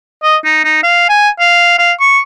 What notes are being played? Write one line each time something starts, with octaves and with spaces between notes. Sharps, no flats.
D#5
D#4
D#4
F5
G#5
F5
F5
C#6